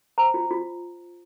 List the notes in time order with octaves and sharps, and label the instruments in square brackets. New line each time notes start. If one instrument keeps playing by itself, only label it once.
[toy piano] C5 A#5
F4
F4